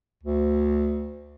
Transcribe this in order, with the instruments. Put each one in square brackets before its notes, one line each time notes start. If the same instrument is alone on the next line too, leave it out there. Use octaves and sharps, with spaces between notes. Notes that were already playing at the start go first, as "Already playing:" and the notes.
[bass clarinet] D2